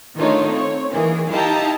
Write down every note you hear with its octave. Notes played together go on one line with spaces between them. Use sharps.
D#3 A3 D4 D#4 F4 C#5
C4 C#5
D#3 E3 A#3 G#4
D#4 E4 G4 F5 A5 A#5